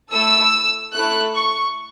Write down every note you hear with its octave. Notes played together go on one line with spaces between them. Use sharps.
A3 E4 A4 E6
A3 E4 A4 F#6
C#6